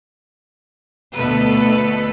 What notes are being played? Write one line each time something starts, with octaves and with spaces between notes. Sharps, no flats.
D2 B2 A3 A4 B4